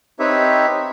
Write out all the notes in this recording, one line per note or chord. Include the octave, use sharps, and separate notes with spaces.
C4 D#4 G4 B4 C#5 E5